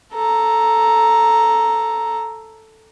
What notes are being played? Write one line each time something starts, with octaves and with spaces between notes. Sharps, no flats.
A4 A#5